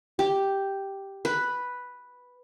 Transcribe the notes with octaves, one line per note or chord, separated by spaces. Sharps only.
G4
B4